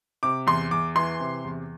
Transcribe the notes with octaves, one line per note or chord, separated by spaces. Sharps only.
C3 D6
E2 C6
E2 D6
E3 C6
C3
E2